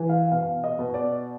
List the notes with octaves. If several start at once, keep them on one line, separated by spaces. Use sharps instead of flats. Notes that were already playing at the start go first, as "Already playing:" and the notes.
Already playing: E3
F5
B2 F5
D#5
B2
D5